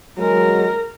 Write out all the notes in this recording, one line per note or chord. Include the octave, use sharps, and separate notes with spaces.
F#3 G#3 A#4